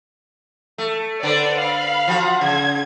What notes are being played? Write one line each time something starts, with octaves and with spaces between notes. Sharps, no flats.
A3
D3 B4 C5 D5
F5 B5
F3 F#4
C#3 G#6